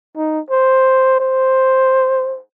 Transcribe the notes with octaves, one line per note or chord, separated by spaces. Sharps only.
D#4
C5
C5